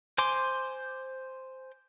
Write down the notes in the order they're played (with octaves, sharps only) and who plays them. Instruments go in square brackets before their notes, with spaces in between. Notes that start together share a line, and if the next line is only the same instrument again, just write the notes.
[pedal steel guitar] C5 G#5 C6 D6